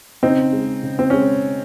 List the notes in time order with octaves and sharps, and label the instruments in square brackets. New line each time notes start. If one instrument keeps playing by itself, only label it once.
[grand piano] C#3 C4 D#4
G#3
C#3
C4
G#3 C#4